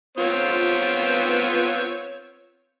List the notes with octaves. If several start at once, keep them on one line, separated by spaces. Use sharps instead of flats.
B3 C4 F4 C#5